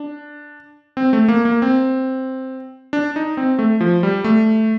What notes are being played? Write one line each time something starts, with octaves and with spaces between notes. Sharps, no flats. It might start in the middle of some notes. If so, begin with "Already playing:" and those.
Already playing: D4
C4
A3
A#3
A#3
C4
D4
D#4
C4
A3
F3
G3
A3